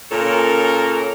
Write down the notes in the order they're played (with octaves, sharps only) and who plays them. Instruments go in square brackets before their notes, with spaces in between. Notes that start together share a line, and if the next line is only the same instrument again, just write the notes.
[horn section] A#2 C#3 C#4 A4 A#4